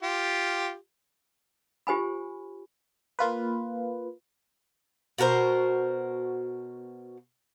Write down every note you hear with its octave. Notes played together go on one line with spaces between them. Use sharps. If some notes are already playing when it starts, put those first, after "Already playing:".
F4 G4
F4 G4 C5 G#5 B5
A#3 F4 B4
B2 F#4 A#4 C5